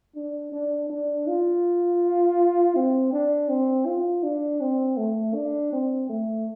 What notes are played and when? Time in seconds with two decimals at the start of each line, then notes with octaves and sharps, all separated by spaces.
0.16 D4
0.52 D4
0.90 D4
1.27 F4
2.76 C4
3.12 D4
3.49 C4
3.87 F4
4.23 D4
4.61 C4
4.97 A3
5.35 D4
5.73 C4
6.09 A3